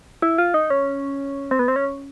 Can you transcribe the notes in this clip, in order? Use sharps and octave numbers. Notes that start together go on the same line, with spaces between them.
E4
F4
D#4
C#4
C4
B3
C4
C#4